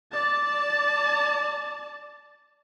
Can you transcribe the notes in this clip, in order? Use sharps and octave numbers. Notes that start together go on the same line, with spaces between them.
D5 A5